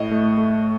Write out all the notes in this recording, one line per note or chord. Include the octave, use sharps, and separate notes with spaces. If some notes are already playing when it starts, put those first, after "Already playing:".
Already playing: A2 D#5
A3
A3